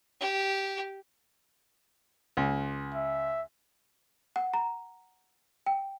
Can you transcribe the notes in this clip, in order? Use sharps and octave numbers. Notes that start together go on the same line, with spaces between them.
G4
C#2
E5
F#5
A#5
G5